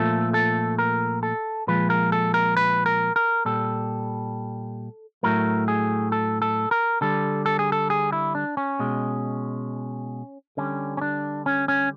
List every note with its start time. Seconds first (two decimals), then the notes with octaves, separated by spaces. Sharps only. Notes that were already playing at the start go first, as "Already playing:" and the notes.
Already playing: A#2 F3 A3 A4
0.34 A4
0.79 A#4
1.23 A4
1.67 A#2 F3 G#3 B4
1.90 A#4
2.12 A4
2.34 A#4
2.57 B4
2.86 A#4
3.16 A#4
3.45 A#2 G3 A4
5.23 A2 F#3 A3 A#4
5.68 G#4
6.12 A4
6.42 A4
6.71 A#4
7.01 D3 G3 A4
7.46 A4
7.59 G#4
7.72 A4
7.90 G#4
8.12 E4
8.35 D4
8.57 C#4
8.79 B2 G#3
10.57 D3 G3 C#4
10.97 C#4
11.01 D4
11.46 C#4
11.68 C#4